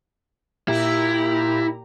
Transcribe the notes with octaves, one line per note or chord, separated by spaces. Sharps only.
A#2 E4 G4 A#5